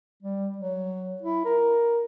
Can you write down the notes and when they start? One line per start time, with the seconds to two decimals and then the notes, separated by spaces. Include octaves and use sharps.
0.23 G3
0.58 F#3
1.22 E4
1.45 A#4